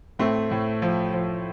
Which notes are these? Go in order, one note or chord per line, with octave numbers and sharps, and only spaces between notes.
A2 A3 C4
A2
F3
F3